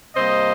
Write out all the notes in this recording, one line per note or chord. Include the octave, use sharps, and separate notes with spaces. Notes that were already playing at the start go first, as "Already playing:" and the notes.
C3 G3 A#3 C5 D#5